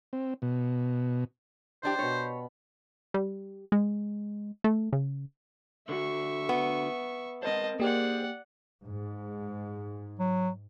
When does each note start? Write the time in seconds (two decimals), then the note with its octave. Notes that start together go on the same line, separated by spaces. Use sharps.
0.13 C4
0.42 B2
1.83 E3 D4 G4 C5
1.99 B2 C#5 B5
3.14 G3
3.72 G#3
4.64 A3
4.93 C#3
5.89 D3 F#4 E5 C#6
6.49 B3
7.43 C4 A#4 C5 D#5 A5
7.80 A#3 G4 G#4 C5 D5 F#5
8.86 G#2
10.19 F#3